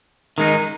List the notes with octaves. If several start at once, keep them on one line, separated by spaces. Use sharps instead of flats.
D#3 G#3 D#4